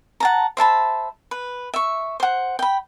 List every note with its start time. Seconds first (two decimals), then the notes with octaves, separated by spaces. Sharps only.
0.20 F#5 A5 A#5
0.57 C5 E5 A5 B5
1.31 B4
1.74 E5 C#6
2.20 C5 F#5
2.59 G5 B5